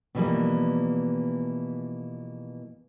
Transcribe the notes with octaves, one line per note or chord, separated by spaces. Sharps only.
B2 D3 E3 F3 G3 A#3